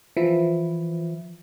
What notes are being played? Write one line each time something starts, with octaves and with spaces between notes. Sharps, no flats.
E3 F3 E4